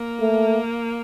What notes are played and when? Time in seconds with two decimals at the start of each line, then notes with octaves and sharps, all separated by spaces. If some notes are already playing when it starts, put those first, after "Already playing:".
Already playing: A#3
0.21 A3